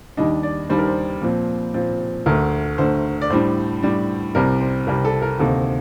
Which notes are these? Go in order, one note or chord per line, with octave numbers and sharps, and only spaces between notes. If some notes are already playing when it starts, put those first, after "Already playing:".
D#2 D#3 G3 D4 D#5
D5
D#2 D#3 G3 D4 C5
A#4
C5
A#2 F3 C4
A#2 F3 C4
D2 D3 A3 A#4
D2 D3 A3 C5
D5
A2 G3 D4 C5
A2 G3 D4
C2 C3 G3 A#4
C5
C2 C3 G3 A#4
A4
A#4
D2 C3 D#3 A#3 D#4 A4